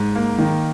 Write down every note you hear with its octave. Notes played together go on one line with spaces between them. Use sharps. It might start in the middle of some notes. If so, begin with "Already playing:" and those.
Already playing: G#2
A#3
D#3